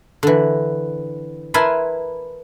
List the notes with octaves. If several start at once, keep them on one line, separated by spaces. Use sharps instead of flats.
D3 E3
E4 A#4 B4 G#5 A5 C6